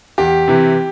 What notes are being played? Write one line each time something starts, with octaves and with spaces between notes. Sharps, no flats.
E2 G4
C3 E3